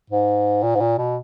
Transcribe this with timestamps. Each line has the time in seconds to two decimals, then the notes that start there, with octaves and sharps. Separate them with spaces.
0.10 G#2
0.63 A#2
0.75 G#2
0.81 A#2
0.98 B2